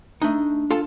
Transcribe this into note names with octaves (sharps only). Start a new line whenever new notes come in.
A3 D4 D#4
F4 A4 A5